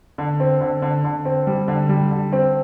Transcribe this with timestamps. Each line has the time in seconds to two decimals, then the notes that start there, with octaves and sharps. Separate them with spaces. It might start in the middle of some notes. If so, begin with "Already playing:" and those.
0.18 D3
0.40 C4
0.61 D3
0.82 D3
1.04 D3
1.25 C4
1.47 G3
1.68 D3
1.89 G3
2.11 D3
2.33 C4